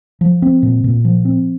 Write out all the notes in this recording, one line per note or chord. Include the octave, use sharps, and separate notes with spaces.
F3
C4
A#2
A#2
F3
C4